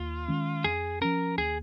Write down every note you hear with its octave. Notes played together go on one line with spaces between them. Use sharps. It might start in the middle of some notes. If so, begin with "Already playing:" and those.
Already playing: D#2 F4
D#3 G#3 C#4
F2 G#4
F3 C#4 A#4
D#2 G#4